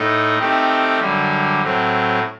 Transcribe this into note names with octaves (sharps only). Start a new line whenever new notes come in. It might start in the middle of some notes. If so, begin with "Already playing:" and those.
Already playing: A2 A3 D#4
D#3 A3 C4 G4
F#2 D3 G3
A2 F#3 C4